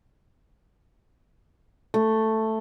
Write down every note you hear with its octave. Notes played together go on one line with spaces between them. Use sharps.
A3